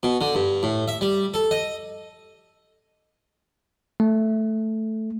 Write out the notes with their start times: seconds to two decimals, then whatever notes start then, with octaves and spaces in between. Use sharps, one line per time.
0.03 B2
0.21 D3
0.35 G2
0.63 A2
0.88 E5
1.01 G3
1.34 A4
1.51 D#5
4.00 A3